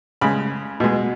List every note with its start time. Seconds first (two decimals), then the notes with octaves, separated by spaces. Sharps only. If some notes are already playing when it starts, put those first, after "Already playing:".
0.21 C#3 G#3 B5
0.80 B2 G#3